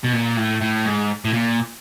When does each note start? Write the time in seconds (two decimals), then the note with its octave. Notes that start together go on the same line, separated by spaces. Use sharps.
0.04 B2
0.13 A#2
0.37 A2
0.62 A2
0.86 G#2
1.25 A2
1.33 A#2